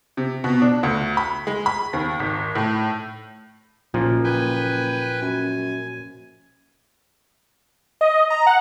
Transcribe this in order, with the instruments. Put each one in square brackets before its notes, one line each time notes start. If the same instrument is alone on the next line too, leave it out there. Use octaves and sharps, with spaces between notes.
[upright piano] C3
B2
D4
D2
B5
G#3
B5
D#2
G#1
A2
[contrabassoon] F#1 [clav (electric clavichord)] A#2 F3
[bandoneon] B4 G5 G#5
[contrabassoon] F#2 [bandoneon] G#5
[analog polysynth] D#5
A#5
F#5